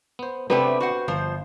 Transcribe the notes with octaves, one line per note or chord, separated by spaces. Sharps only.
B3 C5
C3 A3 B3 C4 D4 G4 B4
F#4 C5 F#5
G1 F3 C5